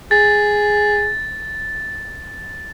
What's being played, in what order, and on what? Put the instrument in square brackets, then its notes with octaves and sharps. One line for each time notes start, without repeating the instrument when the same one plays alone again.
[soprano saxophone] G#4 [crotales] A6